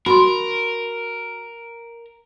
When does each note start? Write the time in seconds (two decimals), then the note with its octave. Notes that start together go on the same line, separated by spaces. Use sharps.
0.06 F#4 A#4 B5 C6